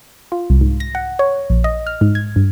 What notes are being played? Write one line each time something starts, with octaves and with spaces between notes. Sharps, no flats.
F4
C2
G#2
A#6
F#5
C#5
A#1
D#5
F6
G#2
G#6
G2